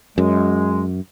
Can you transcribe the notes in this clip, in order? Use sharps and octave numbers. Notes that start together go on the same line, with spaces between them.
F#2 G#3